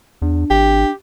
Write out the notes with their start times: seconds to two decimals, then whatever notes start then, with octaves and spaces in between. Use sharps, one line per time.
0.22 E2 D4
0.50 G#1 G4